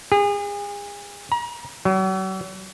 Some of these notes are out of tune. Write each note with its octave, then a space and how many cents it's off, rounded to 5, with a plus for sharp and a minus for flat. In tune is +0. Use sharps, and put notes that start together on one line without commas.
G#4 -35
A#5 +35
F#3 +40